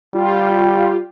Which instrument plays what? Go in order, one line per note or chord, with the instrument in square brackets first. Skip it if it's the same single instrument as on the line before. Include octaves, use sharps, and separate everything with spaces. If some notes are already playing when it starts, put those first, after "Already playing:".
[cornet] G3 [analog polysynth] F4 G4